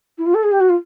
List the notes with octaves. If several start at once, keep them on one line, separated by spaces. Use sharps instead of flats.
E4
F4
A4
G#4
G4
F#4
F4